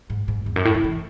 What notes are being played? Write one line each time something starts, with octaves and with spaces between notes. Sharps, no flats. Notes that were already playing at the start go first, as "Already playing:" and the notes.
G#2
G#2
E2
F#2
A2
C#3
E3